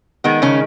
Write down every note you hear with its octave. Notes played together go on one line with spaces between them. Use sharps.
D#3 G#3 B3
C#3 C#4